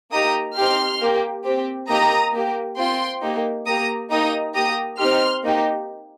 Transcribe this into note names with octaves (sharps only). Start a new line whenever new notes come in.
A#3 D#4 G4 A#5 D#6
C4 D#4 G4 C6 F6
A#3 G4
C4 G4
A#3 D#4 G4 A#5 D#6
A#3 G4
C4 F4 G5 C6
A#3 D#4 G4
A#3 G4 A#5 D#6
A#3 D#4 G4 A#5 D#6
A#3 G4 A#5 D#6
C4 D#4 G4 C6 F6
A#3 D#4 G4